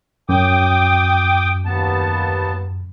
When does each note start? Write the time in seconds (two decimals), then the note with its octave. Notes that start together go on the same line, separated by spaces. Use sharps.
0.29 F#2 G5 D6 D#6
1.65 D#2 B3 A5